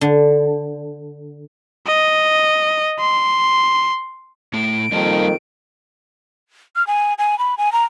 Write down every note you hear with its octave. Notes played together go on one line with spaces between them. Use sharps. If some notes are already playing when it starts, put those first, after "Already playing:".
D3
D#5
C6
A2 A3 D7
F2 D#3 G3 A#3 D#4 A5
F6
G#5
G#5
B5
G#5
A#5